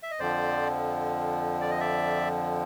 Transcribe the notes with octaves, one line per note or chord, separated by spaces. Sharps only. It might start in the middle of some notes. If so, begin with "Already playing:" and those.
E5
D#5
F2 D3 F3 C5 D5
D5
D#5
D5 E5